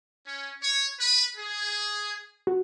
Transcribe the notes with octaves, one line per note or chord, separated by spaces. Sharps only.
C#4
C#5
B4
G#4
F#4